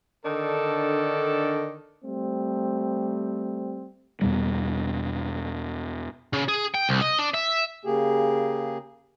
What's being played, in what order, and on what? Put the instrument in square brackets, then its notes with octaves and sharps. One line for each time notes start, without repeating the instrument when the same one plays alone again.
[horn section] D3 D#3 D4 A4
[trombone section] G3 A3 C4
[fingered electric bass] E2 B2 G3
[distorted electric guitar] C#3
G#4
G5
C2
D#5
D4
E5
[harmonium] C#3 A#3 G4 G#4